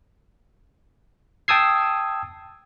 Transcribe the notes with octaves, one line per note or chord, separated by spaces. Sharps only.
G5 A5 D#6 E6 G#6 C7